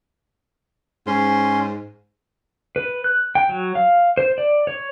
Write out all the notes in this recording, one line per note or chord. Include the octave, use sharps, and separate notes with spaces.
G#2 C#4 C6
B4
F#6
G5
F#3
F5
C5
D5
C#5